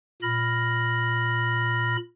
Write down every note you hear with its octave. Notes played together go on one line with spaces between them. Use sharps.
A#2 B5 F6 A#6